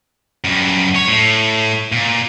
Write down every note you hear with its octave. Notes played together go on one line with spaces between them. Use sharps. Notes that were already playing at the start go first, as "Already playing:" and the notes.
F#2 G3
C#5
A2
A#2